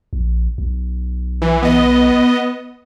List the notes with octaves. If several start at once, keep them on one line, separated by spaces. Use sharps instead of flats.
A#1
B1
E3
B3 D#5